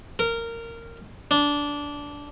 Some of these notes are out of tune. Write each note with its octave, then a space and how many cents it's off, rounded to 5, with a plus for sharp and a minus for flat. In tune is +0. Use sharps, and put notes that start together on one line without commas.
A#4 -15
D4 -15